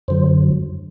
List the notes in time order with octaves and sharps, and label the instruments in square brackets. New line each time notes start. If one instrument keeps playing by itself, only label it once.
[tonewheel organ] F#2 D3 F#3 C5